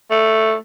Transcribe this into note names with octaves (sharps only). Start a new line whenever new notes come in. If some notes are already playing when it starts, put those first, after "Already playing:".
A3